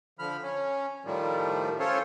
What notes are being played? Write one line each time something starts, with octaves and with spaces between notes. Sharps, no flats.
D3 F3 B5 F6
C#4
A2 D#3 F3 G3
C#4 F4 A4 C5 C#5